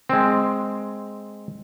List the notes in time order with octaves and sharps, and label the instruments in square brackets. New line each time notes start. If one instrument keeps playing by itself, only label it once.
[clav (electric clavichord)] G#3 C4